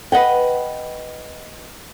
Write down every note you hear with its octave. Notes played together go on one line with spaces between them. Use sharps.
B4 D#5 F#5 G5